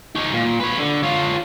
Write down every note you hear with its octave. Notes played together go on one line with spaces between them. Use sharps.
D#4 C#5
A#2
B4 C#5
D3
F4 C#5